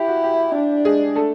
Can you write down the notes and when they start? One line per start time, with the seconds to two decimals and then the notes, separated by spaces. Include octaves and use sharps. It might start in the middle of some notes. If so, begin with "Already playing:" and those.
Already playing: E4 G4
0.08 F#4
0.24 G4
0.54 D4
0.85 G#3 G#4
1.15 A3 A4